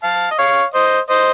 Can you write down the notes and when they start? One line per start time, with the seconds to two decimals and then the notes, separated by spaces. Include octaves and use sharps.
0.03 F5 A5
0.31 D#5
0.39 C#5 F5
0.74 C5 D#5
1.10 C5 D#5